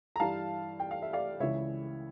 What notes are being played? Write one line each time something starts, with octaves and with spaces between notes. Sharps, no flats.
A#5
G2 E3 F5 A5
G5
F5
E5
D5 F5
C#2 C#3 E3 C#5 E5